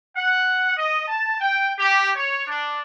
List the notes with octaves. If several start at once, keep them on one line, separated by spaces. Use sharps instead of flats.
F#5
D#5
A5
G5
G4
C#5
D4